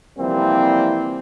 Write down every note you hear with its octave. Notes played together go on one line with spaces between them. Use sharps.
C3 E3 F3 G3 A#3 C4